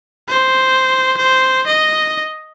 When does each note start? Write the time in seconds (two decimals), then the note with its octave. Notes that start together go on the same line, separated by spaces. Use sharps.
0.29 C5
1.17 C5
1.67 D#5